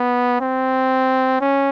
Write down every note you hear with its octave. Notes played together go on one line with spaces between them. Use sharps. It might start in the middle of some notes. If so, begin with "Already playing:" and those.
Already playing: B3
C4
C#4